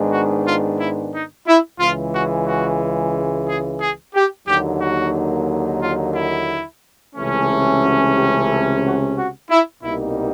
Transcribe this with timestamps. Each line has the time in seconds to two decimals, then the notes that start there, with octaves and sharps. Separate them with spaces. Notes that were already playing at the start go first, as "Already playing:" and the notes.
Already playing: G#2 D#3 G#3 B3 D4
0.12 F#4
0.46 F4
0.80 E4
1.14 D#4
1.47 E4
1.80 C#2 C#3 E3 G#3 F4
2.14 F#4
2.47 F#4
3.48 G#4
3.81 G#4
4.15 G4
4.48 D#2 D3 F#3 A#3 D#4 G4
4.81 F#4
5.83 F4
6.16 E4
7.16 C#2 C3 E3 A3 C#4
7.83 F#4
8.16 G4
8.49 A4
8.83 F#4
9.17 F#4
9.50 E4
9.83 C2 B2 G3 A#3 D#4 E4